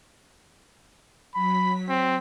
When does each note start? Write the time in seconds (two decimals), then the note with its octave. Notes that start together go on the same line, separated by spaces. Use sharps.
1.35 F#3 B5 B6
1.89 C4